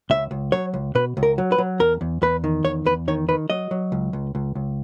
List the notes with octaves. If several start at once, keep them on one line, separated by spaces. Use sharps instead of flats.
C#2 E5
C#2
F#3 C#5
C#2
B2 B4
C#2
A#4
F#3
B4
F#3
E2 A#4
E2
E2 B4
D#3
E2 C#5
E2 B4
D#3 C#5
D#3 B4
F#3 D#5
F#3
C#2
C#2
C#2
C#2